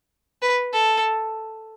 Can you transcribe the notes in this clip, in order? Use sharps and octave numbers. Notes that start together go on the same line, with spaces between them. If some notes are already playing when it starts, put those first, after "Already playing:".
B4
A4